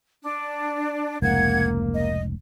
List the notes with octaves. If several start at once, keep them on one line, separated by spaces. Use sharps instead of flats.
D4
F1 C#2 G#2 A#3 F#5 G#6
D#5